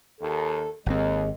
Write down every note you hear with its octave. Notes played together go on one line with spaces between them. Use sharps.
D#2 A4
G#1 D#2 C#3 G#3 C4